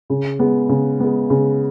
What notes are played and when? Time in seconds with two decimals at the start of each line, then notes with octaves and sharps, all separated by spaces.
0.10 C#3
0.39 G#3 B3
0.69 C#3
1.00 G#3 B3
1.30 C#3